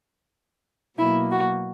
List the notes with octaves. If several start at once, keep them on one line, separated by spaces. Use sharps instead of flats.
B2 F#3 A#3 E4
F#4